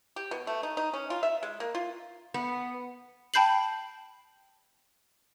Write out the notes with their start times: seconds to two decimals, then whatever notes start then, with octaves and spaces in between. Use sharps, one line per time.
0.16 G4
0.31 B2
0.47 A3
0.63 D#4
0.77 D#4
0.93 C#4
1.10 F4
1.23 E5
1.43 G#3
1.60 A#3
1.75 F4
2.34 B3
3.34 G5 A5 B5 G6 C7 F#7